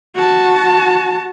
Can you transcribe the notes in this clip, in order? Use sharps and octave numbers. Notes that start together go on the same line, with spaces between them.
F#4 A5